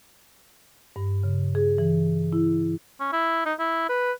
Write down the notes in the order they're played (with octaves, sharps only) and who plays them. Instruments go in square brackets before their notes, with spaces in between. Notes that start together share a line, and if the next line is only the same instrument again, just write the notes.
[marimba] G2
C#3
G#4
E3
E4
[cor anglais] C#4
E4
D#4
E4
B4